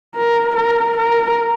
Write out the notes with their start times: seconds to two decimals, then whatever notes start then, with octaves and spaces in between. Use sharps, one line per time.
0.16 A#4
0.57 A#4
0.97 A#4